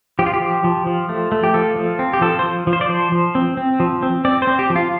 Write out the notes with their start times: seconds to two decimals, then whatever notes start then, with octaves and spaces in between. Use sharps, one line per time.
0.19 F3 G4
0.26 F4
0.34 G4
0.42 F3
0.64 F3
0.87 F3
1.09 A3
1.32 A3
1.44 G4
1.54 F3 A4
1.76 F3
1.99 C4
2.13 G4
2.21 F3 A4
2.39 C5
2.45 F3
2.67 F3
2.73 C5
2.81 D5
2.89 F3 C5
3.12 F3
3.35 C4
3.57 C4
3.80 F3
4.03 C4
4.25 C4 D5
4.42 C5
4.47 C4
4.59 G4
4.70 F3
4.76 F4